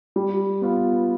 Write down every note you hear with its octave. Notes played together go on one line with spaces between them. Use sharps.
G3
B3 F4